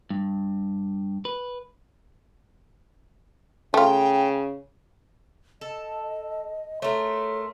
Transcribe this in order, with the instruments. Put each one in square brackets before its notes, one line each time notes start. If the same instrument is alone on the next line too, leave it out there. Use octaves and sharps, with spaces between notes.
[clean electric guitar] G2
B4
[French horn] C#3 [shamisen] A3 F4 [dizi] G5
[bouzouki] A4 [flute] D#5
[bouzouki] A3 A#4 [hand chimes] A4 C#5 [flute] C6